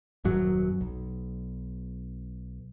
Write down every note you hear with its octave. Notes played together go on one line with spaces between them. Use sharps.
D#1 F#2 F#3
B1